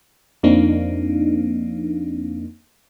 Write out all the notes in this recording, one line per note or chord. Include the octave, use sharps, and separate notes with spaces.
F2 F3 A#3 C4 D4 D#4